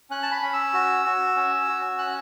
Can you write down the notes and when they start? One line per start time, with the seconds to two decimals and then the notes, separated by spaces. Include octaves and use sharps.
0.11 C#4 F#6
0.23 A5
0.31 B5
0.42 C#4
0.53 E6
0.73 F#4
1.05 F#4
1.36 C#4
1.68 F#4
1.98 C#4 F#6